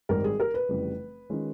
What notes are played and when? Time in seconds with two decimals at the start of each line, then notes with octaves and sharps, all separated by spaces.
0.09 G#1 G#2 D#3 G3 A#4
0.24 G#4
0.40 A#4
0.54 B4
0.69 F1 F2 C#3 E3 G3
1.30 D#3 G#3 C#4 F4